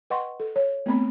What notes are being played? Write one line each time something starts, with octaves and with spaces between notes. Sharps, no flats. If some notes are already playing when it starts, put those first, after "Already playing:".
B4 D#5 F#5 G5 C6 C#6
A4
C#5
A3 B3 C4 B5